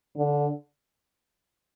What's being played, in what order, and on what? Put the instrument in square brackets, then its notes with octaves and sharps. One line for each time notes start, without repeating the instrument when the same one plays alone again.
[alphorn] D3